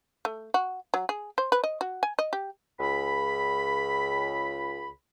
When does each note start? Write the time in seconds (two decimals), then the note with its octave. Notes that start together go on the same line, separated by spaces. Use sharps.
0.25 A3
0.54 F#4
0.94 F#3
1.09 G#4
1.38 C5
1.52 B4
1.64 D#5
1.81 F#4
2.03 G#5
2.19 D#5
2.33 G4
2.79 C#2 B5